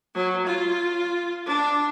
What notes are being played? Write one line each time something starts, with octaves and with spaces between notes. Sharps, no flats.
F#3
F4
D4